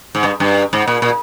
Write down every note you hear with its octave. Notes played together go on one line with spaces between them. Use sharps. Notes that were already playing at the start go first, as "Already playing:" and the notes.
G#2
G2
G2
G#2
A#2
A#2